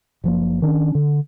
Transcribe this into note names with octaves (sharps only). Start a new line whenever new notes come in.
F#1 F3 A#3
D#3 C#4 D4
D3